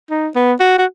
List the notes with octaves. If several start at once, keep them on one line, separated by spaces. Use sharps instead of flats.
D#4
B3
F#4
F#4